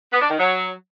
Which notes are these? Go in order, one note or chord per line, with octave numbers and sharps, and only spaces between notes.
B3
D4
D#3
F#3